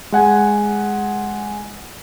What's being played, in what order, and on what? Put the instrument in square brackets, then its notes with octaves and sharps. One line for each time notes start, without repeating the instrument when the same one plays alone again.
[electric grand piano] G#3 F#5 G#5